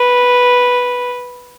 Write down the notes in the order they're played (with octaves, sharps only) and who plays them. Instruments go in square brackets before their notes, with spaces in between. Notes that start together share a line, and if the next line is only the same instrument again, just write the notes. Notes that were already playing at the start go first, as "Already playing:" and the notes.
Already playing: [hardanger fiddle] B4